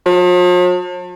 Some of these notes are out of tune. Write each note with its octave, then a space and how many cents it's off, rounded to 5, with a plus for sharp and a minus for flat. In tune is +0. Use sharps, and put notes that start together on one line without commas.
F3 +45